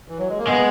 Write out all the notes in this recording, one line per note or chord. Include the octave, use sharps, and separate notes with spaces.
E3
F#3
G#3
A#3
G#3 B3